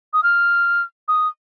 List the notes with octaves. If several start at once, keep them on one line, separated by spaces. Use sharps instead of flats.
D#6
F6
D#6